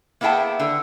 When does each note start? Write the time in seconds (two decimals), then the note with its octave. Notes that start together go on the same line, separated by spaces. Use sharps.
0.21 A#3 B3 E4 G#4 G5 A5
0.60 D3